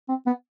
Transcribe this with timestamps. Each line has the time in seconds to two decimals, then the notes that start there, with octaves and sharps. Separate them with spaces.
0.08 C4
0.26 B3